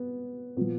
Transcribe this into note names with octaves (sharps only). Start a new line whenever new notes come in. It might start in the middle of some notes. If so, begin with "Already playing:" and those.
Already playing: B3
A#2 F3 B3